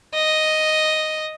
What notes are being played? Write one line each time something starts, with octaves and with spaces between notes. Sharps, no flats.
D#5